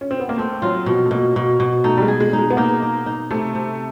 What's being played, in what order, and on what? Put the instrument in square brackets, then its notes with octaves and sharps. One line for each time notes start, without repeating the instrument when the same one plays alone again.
[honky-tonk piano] C#4
C4
B3
A#3
[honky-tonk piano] A3 [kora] C4
[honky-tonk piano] F#3 [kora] F4
[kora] B2 [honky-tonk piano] F3
[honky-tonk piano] A3
[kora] B2 [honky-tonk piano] A#3
[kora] B2
B2
[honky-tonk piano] A3 [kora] D#4
[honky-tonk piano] G3
G#3
[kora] G#4
[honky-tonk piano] G#3
[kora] D#4
[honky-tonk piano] G#3
B3
[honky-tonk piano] A#3 [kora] D#4
[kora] D#4
D#4
[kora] C3 [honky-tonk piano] A3
[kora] C3